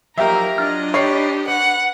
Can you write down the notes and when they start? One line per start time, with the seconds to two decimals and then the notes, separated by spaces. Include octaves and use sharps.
0.18 F3 F#3 A#3 D#4 G4 A#4 E5 A#5
0.58 F#3 D4 F4 D#5 F6
0.94 D#4 G4 C#5 D5 B5 C7
1.48 B4 F#5